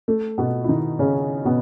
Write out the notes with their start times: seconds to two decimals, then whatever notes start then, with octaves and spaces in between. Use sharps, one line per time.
0.08 A3
0.38 B2 B3
0.64 E4
0.68 D#3 D#4
0.99 C#3 C#4
1.45 B2 B3